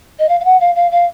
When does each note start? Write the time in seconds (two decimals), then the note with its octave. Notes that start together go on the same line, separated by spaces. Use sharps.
0.19 D#5
0.29 F5
0.40 F5
0.45 F#5
0.60 F5
0.75 F5
0.91 F5